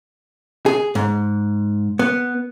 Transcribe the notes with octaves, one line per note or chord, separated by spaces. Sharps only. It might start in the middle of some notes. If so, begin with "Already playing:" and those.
G#4
G#2
B3